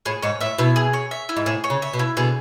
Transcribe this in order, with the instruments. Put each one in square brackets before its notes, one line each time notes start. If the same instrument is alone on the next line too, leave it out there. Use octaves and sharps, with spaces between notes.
[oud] A2 [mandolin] G#4
[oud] G#2 [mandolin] C#5
[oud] A2 [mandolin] E5
[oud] B2 [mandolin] E4
[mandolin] G#4
C#5
E5
E4
[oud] G#2
[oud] A2 [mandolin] G#4
[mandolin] C#5
[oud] C#3
[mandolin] E5
[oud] B2
[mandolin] E4
[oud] B2 D3 [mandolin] G#4